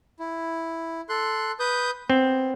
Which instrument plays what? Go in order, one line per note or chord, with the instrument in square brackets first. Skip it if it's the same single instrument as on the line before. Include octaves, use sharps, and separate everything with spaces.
[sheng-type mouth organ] E4
A4 C6 F#6
B4 D#6 G6
[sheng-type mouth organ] B3 [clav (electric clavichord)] C4